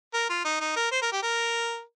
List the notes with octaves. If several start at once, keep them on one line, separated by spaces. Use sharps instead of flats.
A#4
F4
D#4
D#4
A#4
C5
A#4
G4
A#4